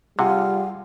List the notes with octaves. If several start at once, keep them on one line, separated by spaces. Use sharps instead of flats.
C3 G3 F4 G#4 F#5 G#5